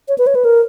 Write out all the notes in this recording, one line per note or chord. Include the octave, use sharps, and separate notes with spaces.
C#5
B4
C#5
B4
A#4